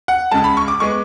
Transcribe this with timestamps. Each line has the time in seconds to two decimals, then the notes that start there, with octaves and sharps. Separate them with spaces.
0.08 F#5
0.31 C#2 C#3 G#3 A5
0.44 B5
0.57 C#6
0.68 D6
0.80 G#3 B3 C#6